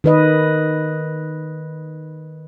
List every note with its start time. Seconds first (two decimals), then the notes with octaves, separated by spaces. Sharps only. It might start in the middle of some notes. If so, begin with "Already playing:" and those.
0.04 D#3 B4 D#5